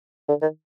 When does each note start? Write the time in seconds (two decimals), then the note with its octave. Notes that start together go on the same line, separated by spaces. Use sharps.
0.29 D3
0.42 D#3